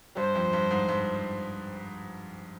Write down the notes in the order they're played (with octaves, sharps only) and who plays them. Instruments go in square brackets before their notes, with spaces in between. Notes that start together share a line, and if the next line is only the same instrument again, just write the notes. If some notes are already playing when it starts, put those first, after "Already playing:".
[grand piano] G2 [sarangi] C5
[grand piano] F2
G2
G#2
G2